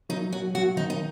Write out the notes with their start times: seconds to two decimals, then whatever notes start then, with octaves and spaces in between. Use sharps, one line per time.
0.09 F#3 D#4
0.32 F#3 F#4
0.54 F#3 F#4
0.76 D#3 D#4
0.90 D#4